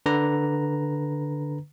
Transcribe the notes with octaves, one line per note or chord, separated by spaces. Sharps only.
D3 B4 A#5